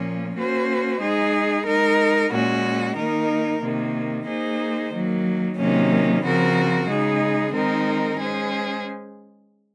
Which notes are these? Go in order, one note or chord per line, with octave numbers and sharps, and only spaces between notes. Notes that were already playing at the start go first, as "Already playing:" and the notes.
Already playing: A#2 F3 A#3 C#4
A#3 C#4 F#4 C5
G#3 D#4 G#4
G#3 D#4 A#4
A#2 G#3 C#4 F#4
D#3 A#3 D#4 A#4
C3 D#3 A#3
A#3 D#4 G#4 C5
D#3 F#3 A#3
C3 D#3 F#3 A#3 C#4
C#3 F3 C4 F#4 A#4
C#3 G#3 D#4 G#4
D#3 G#3 C4 D#4 A#4
G#3 C#4 G#4 C5